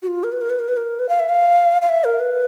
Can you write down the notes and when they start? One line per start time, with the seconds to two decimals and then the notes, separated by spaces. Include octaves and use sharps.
0.02 F#4
0.07 F4
0.24 A#4
0.32 B4
0.41 A#4
0.50 B4
0.59 A#4
0.68 B4
0.77 A#4
0.99 B4
1.09 F5
1.20 E5
1.29 F5
1.82 F5
1.89 E5
2.04 A#4
2.19 B4